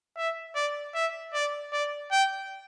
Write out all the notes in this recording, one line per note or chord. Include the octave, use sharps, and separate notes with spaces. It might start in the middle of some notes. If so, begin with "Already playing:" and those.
E5
D5
E5
D5
D5
G5